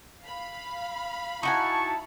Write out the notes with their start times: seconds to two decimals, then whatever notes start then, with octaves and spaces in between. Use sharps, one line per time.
0.22 F5 B5
1.43 D#4 E4 F#4 G#5 A5 C#6